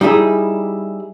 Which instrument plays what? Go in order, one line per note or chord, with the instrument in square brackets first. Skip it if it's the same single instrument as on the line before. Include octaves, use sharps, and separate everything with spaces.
[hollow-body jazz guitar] G3 D#4 E4 G#4